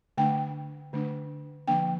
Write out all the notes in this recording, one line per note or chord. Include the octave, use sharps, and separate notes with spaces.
D3 A3 D4 G5
D3 A3 D4
D3 F3 A#3 D4 G5